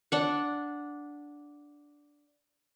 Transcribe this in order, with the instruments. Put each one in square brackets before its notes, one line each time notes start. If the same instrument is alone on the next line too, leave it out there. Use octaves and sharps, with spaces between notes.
[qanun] D4 F#5